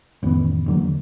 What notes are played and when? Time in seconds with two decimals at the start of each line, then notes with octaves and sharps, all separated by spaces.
0.23 A1 F2 D#3 B3
0.67 E2 D3 F#3 A#3